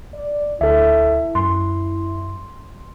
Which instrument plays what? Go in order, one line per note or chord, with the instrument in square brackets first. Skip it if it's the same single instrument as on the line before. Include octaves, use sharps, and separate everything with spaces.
[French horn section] D5
[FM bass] D2 [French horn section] E4 [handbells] A4 E5
[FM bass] F#2 [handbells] C6